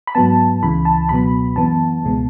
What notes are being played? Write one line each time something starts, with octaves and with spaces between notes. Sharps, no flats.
B5
G#2 F#3 B3 A5
C#2 C#3 E3 B5
A5
C#2 B2 F#3 B3 B5
F#2 E3 B3 A5
C#2 B2 G#3 B3